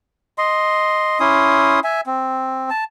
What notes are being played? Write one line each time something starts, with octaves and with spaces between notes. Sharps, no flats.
D#5 C6
C#4 E4 C6 D#6
E5 G#5
C4
A5